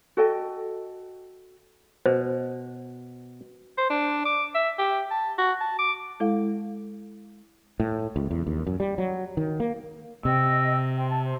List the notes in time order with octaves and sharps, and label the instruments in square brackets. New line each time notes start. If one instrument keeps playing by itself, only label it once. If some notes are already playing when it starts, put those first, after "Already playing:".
[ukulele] F#4 A4 D#5 G5
[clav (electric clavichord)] B2 [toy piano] C5
[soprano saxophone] C5
D4
D6
E5
G4
A5
F#4
A5
D6
[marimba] G#3 E4 A4 F5
[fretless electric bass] A2
C#2
E2
D#2
F#2
G3
F#3
D#3
A#3
[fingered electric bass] C3 [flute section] D#5 G5 E6
[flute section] C5 G5
A5
C5